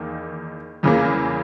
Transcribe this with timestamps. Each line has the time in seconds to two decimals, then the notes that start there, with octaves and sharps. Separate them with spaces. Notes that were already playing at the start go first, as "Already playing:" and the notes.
Already playing: E2 D#3 A#3
0.83 E2 C#3 E3 A#3